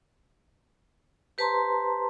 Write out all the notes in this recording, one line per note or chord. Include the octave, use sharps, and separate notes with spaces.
G4 B4 C5 A5 A#5 C6